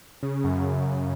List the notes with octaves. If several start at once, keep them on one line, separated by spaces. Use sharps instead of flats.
C#3
F#2
C#3
F#2